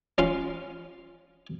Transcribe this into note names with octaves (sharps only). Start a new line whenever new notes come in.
C#4 F4 F5 C6